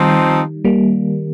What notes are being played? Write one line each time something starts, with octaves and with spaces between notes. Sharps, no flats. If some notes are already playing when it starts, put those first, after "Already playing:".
Already playing: D#3 F3 G3 C4 D#4
G3 A#3